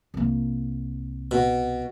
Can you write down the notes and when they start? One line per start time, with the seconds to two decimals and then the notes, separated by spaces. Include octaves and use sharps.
0.14 C2 A#3
1.31 B2